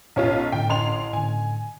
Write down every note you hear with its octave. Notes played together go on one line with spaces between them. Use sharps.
B1 C#4 F4
A2 D3 G5
A1 C6 F7
A2 D3 G#5